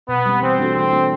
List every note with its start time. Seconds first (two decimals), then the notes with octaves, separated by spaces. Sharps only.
0.09 B2 B3
0.26 G3 C4
0.42 E3 C4
0.59 A3 D4 F#4 A4
0.75 E3 C4
0.92 A3 D4 F#4 A4